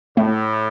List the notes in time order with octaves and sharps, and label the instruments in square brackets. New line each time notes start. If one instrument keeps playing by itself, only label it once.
[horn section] A2 [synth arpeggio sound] A3